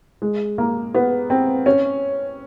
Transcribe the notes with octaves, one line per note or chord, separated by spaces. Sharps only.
G#3
A#3
B3
C4
C#4